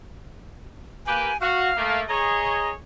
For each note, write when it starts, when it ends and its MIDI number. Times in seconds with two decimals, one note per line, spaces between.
1.06 1.30 58
1.06 1.30 67
1.06 1.30 71
1.06 1.37 80
1.41 1.70 66
1.41 2.02 77
1.76 2.02 57
1.76 2.02 58
2.09 2.71 68
2.09 2.71 73
2.09 2.71 75
2.09 2.70 82